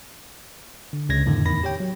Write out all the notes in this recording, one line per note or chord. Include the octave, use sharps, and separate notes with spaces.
D3
C#2 C#3 G#6 A#6
F2 A2 D3 D#3
E2 D#3 B5 A#6
G4 C#5 G5
F#3